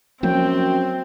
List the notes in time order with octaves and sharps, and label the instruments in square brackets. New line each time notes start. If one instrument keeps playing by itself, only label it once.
[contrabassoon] F#2 [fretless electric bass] F3 F#3 A#3 [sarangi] C4 [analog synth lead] G5